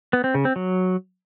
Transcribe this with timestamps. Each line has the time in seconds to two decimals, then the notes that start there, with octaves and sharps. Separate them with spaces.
0.13 B3
0.24 C4
0.34 C#3
0.45 C4
0.56 F#3